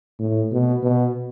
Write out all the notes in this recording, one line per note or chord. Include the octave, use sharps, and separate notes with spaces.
A2
B2
B2